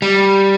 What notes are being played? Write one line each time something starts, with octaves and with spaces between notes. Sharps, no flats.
G3